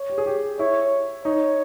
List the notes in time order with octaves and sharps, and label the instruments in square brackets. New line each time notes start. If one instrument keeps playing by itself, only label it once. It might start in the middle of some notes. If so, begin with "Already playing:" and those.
Already playing: [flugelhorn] C#5
[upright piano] G4
G#4
G4
[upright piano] E4 [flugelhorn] C#5
[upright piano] D#4 [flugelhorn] C#5